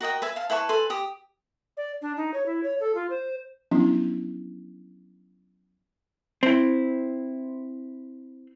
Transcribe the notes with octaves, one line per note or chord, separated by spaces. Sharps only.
F#4 A#4 D#5 G5
B4 E5 G#5
F5 A5
E4 B4 A5 C#6
A4 B4 G#5 C6
G4 D#6
D5
D4
D#4
C#5
E4
C#5
A4
F4
C5
F3 F#3 B3 C#4 D4 E4
C4 E4